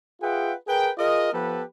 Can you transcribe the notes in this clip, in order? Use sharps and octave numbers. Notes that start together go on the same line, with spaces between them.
F4 G#4 B4 E5 F#5 G5
G#4 A#4 B4 G5
F4 G#4 A#4 D#5
F3 B3 G4 A4 B4